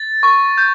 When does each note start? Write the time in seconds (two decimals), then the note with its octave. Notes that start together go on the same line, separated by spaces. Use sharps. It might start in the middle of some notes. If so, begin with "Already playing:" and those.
Already playing: A6
0.23 C#6
0.58 G6